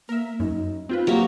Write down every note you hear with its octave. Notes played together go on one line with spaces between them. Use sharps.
A#3 A#4 E5
F#2 D#4
C4 F4 B4
F#3 A#3 G4